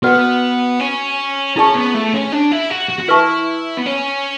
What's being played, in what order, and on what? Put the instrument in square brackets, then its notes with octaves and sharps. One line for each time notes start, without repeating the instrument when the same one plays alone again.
[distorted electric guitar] B3 [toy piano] F#4 B4 D5 F#5
[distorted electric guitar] C#4
[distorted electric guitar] C#4 [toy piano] E4 G#4 D5 A5 C#6
[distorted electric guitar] B3
A3
C#4
D4
E4
F#4
F#4
F#4
[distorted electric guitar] E4 [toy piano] B4 E5 A5 C#6
[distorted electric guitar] B3
C#4